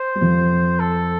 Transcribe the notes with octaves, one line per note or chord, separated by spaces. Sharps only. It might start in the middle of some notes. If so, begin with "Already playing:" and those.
Already playing: C5
G3
F2 F3
A4